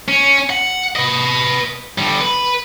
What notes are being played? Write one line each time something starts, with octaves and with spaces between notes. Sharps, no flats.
C#4
F#5
B4 D#5
D3 G3
B4